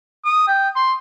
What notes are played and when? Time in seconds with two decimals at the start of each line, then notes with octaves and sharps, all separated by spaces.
0.25 D#6
0.48 G5
0.76 C6